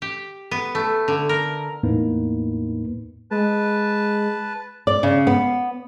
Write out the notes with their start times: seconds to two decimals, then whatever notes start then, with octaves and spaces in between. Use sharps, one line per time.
0.02 G4
0.51 B3
0.75 A3
1.08 D3
1.29 A#4
1.83 E2 A2 A#3 B3 D#4 B4
3.31 G#3 B4 A5
4.87 D5
5.03 C#3
5.27 B3